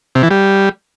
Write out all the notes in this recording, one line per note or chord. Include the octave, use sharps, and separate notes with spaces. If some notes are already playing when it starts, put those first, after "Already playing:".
C3
E3
G3